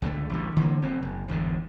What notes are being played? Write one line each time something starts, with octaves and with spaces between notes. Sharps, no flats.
C#2 D3 F3 A3
A1 D2 G3
D3 E3 A3 A#3
F1 F2 C4
F#1
G1 E2 G#2 D3